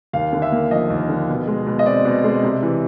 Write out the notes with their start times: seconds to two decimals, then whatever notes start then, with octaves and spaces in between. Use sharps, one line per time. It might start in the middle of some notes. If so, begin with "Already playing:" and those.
0.13 D#2 F5
0.33 D3
0.42 E5
0.52 A#3
0.71 F3 D#5
0.90 D#2
1.09 D3
1.29 B2
1.47 G#3
1.67 B2
1.79 D#5
1.86 C4 D5
2.05 B2
2.24 G#3
2.43 C3
2.63 E3